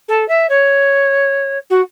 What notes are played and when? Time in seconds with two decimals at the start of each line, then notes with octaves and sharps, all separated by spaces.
0.08 A4
0.28 E5
0.49 C#5
1.70 F#4